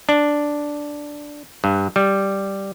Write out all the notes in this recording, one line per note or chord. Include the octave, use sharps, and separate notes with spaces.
D4
G2
G3